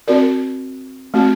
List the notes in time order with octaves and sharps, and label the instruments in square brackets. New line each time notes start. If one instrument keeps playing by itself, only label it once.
[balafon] C4 F#4 A#4 D5
A3 C4 F#4